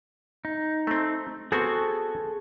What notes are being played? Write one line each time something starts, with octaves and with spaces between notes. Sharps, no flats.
D#4
A3 C4
B3 C4 F#4 G#4 A4 C#6